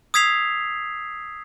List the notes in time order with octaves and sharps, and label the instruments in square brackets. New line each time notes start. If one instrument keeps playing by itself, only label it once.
[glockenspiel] D#6 E6 G#6 B6 C7 F7